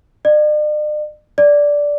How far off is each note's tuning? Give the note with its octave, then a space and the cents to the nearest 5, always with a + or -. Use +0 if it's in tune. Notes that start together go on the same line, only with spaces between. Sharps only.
D5 +45
D5 -10